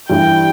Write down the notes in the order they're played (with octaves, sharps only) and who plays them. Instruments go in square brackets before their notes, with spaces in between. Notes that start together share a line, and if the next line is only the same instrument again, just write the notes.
[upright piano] G2 E3 G3 [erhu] G5